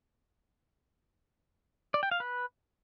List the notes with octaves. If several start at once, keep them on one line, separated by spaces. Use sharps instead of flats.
D5
G5
F5
B4